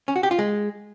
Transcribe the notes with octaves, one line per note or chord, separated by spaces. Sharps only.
C#4
F#4
G4
F4
G#3